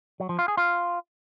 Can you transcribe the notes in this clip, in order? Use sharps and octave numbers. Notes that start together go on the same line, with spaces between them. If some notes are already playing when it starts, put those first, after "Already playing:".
F#3
F3
F4
G#4
F4